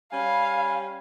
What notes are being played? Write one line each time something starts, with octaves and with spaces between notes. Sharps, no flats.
G3 C#4 F5 G#5 B5